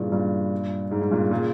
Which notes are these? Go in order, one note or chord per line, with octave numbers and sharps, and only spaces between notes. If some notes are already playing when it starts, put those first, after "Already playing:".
Already playing: G2 A#2 C#3 E3
G2 A#2
G#2
G#2
G2 A#2
A#2 C#3